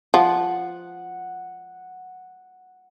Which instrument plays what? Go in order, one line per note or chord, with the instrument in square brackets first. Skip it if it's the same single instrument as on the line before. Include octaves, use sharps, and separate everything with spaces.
[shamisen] F3 [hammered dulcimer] F#5